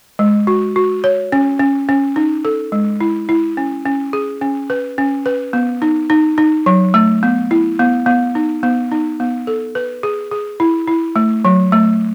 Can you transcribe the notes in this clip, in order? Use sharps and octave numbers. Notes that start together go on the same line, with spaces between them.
G#3
F#4
F#4
C#5
C#4
C#4
C#4
D#4
A4
G#3
E4
E4
C#4
C#4
G#4
C#4
B4
C#4
B4
B3
D#4
D#4
D#4
F#3
A3
B3
E4
B3
B3
D#4
B3
D#4
B3
A4
B4
G#4
G#4
E4
E4
A3
F#3
A3